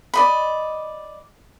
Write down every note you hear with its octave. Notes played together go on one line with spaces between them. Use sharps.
D5 D#5 B5